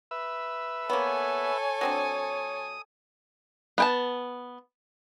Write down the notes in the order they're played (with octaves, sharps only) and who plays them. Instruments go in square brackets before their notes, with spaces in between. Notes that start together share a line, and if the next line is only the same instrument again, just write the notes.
[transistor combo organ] B4 E5
[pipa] A#3 B3 [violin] A4 G#5 [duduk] C#5
[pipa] F#3 C4 D4 [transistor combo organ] D#6
[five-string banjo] B3 G5 A5